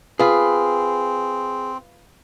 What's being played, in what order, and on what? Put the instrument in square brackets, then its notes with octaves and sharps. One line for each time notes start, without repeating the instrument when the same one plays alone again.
[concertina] C4 [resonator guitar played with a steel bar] F4 B4 [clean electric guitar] G#4